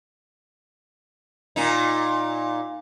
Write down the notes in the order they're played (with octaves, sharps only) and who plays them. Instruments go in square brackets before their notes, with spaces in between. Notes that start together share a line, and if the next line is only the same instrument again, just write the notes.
[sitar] A#2 D#4